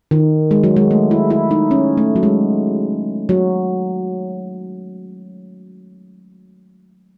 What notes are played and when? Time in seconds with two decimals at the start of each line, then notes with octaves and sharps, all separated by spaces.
0.11 D#3
0.51 G#3
0.64 F#3
0.76 G#3
0.91 A3
1.11 E4
1.30 E4
1.51 D#4
1.71 C#4
1.98 A3
2.16 F#3
2.23 G#3
3.29 F#3